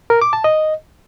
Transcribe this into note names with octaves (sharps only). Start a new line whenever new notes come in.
A#4
D6
A5
D#5